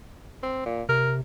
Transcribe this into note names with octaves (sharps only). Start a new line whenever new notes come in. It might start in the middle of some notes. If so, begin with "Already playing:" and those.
C4
A#2
C3 A#4